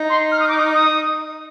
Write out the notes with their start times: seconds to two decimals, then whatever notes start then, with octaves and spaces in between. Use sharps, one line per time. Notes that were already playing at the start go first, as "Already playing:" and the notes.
Already playing: D#4
0.10 C6
0.32 F6
0.40 D#6
0.48 D6
0.57 D#6
0.74 D#6